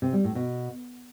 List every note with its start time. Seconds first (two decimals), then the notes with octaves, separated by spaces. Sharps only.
0.02 C3
0.13 G3
0.24 A2
0.35 B2